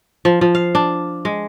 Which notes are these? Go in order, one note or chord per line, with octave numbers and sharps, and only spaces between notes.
F3
F3
F5
D4
G#3